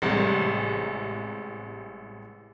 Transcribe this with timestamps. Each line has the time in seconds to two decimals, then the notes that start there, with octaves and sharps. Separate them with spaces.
0.02 A1 C3 G3 G#3